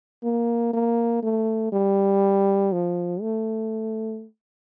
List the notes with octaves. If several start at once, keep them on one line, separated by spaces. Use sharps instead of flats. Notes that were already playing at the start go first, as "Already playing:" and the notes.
A#3
A#3
A3
G3
F3
A3